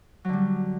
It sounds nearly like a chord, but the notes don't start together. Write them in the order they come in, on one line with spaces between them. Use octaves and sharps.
F#3 D3 G3